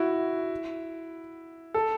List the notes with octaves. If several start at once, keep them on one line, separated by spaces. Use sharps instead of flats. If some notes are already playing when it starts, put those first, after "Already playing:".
Already playing: E4 F#4
A4